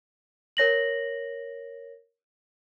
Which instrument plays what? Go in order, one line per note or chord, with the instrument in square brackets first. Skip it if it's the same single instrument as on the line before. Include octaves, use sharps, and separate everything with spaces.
[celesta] A#4 C#5 A#6 F#7